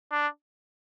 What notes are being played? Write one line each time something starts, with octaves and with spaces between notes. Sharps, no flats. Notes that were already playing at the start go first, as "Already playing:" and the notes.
D4